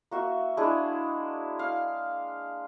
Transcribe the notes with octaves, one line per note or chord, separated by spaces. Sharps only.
A#3 F#4 E5
G#3 D4 E4 G#4
F5